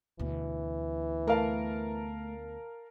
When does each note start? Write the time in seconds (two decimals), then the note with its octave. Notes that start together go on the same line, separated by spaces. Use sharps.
0.20 D2 B2 E3
1.28 A3 A#4 F5 A5